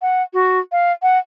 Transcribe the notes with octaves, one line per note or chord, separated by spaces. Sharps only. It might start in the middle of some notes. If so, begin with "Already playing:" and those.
F#5
F#4
F5
F#5